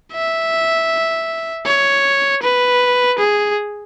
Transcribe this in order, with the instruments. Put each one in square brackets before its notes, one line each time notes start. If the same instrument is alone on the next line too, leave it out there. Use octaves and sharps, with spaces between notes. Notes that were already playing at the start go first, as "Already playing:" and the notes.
[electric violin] E5
C#5
B4
G#4